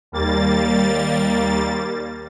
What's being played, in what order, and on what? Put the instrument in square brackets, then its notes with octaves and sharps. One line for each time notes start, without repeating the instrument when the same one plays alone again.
[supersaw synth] D#2 G3 A#3 A6